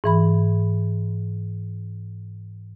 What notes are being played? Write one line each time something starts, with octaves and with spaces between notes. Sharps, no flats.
G#2 E3 B5